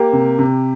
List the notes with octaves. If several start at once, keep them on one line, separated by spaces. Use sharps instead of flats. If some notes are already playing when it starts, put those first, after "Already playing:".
Already playing: A#3 G4
C3
C3